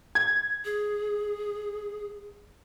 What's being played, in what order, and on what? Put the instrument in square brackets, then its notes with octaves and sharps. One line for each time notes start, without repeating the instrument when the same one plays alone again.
[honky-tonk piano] G#6
[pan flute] G#4